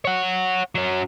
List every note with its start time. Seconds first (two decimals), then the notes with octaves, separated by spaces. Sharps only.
0.05 C#5 F#5
0.75 F#3 C#4